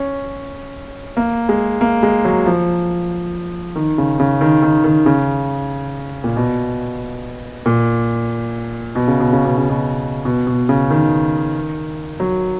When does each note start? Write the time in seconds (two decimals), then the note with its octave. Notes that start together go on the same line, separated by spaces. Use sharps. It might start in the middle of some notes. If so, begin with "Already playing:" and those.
Already playing: C#4
1.17 A#3
1.49 G#3
1.81 A#3
2.03 G#3
2.25 F#3
2.46 F3
3.76 D#3
3.98 C#3
4.20 C#3
4.41 D#3
4.62 D#3
4.84 D#3
5.06 C#3
6.24 A#2
6.36 B2
7.66 A#2
8.95 B2
9.08 C#3
9.20 B2
9.33 C#3
9.45 B2
9.58 C#3
9.70 B2
10.25 B2
10.47 B2
10.69 C#3
10.90 D#3
12.20 F#3